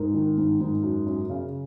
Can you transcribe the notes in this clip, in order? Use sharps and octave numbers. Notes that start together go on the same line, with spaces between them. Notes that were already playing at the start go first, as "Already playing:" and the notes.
Already playing: G#2 A#4
D#3
G#2
G#2
F#2
F#2
C#3